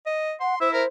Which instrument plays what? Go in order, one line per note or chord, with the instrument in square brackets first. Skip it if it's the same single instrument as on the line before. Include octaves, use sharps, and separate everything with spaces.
[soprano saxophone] D#5
[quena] F#5 [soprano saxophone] C6
[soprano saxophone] E4 [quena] C5 [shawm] E5
[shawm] A#4 [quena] C5